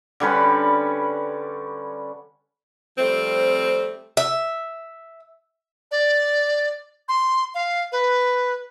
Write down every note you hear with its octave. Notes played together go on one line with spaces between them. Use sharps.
D3 G3 C#4 B4
F3 G3 A3 C4
E5
D5
C6
F5
B4